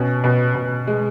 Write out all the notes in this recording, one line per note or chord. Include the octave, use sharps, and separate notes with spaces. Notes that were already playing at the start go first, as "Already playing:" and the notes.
Already playing: B2 C#4
B2
B2
G#3